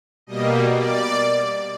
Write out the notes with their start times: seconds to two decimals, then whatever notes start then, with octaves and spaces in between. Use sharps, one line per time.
0.27 B2 G3 A#3 D#5
0.72 D5